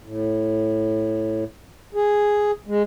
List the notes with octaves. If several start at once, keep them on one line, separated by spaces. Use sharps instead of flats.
A2
G#4
G#3